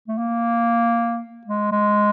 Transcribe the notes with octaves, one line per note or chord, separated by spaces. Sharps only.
A3
A#3
G#3
G#3